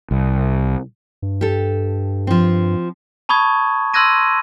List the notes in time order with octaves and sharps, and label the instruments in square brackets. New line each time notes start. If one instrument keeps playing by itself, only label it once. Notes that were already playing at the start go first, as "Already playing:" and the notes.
[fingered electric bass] C2
[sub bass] G2
[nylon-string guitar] G4 A4
F3 C4
[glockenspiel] A5 B5 C#6 D#6 G#6
C6 E6 F#6 G#6 A#6 D#7